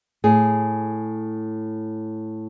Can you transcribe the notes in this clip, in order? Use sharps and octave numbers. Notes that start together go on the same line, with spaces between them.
A2 G#4